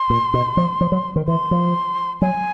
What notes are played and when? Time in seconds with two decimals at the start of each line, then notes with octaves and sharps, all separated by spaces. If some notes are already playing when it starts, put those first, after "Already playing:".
Already playing: C6
0.10 A#2
0.34 B2
0.57 F3
0.81 F3
0.92 F#3
1.16 D#3
1.28 E3 C6
1.51 F3
2.21 F#3 G#5